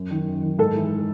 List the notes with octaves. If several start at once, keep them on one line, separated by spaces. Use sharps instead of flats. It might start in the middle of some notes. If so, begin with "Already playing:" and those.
Already playing: F#2
D#3
F#2
D#3
G#2 A4
E3